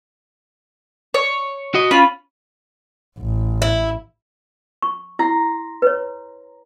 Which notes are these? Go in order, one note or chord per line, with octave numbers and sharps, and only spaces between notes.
C#5
F#4 D#5
C#4 F4 B5
A1
E4
C#6
E4 A#5 C6
B4 C#5